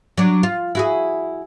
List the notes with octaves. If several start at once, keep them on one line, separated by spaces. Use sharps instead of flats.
F#3 D4
F4
E4 F#4 G#4